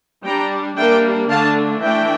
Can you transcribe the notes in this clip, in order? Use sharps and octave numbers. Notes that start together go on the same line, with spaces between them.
G3 D4 G5 A#5
G3 A#3 D4 E5 G5
D3 A3 D4 F5 A5
E3 A3 D4 E5 G5